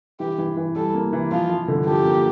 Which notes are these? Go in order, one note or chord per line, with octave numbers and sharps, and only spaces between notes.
E3 G4
E3
E3
G3 A4
A#3
E3
F3 F4
F3
D3
F3 G4
A#3